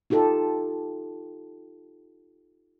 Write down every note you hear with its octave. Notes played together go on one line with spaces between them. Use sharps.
D#4 F4 G4 A4